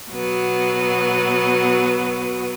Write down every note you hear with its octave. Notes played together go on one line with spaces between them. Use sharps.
B2 F#3 B3